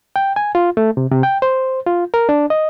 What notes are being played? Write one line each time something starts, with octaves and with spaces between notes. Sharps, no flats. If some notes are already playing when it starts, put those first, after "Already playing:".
G5
G#5
F4
A3
C3
C3
G5
C5
F4
A#4
D4
D#5